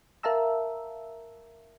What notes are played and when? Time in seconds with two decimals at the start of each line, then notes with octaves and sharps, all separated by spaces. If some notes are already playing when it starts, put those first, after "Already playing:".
0.23 A#4 E5 F5 A5 A#5 E6